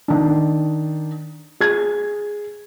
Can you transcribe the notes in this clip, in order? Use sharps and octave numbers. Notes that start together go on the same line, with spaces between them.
D#3 D4
G#4 G#6